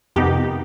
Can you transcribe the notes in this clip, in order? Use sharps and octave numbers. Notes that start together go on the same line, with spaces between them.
F2 C3 D#3 B3 D#4 G4